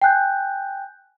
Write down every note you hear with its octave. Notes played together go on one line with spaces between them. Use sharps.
G5 G#5 F#6 G6